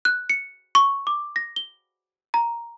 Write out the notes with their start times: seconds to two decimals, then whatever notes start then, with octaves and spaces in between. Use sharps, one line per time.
0.05 F#6
0.30 C#7
0.75 C#6
1.07 D6
1.36 A#6
1.56 G7
2.34 A#5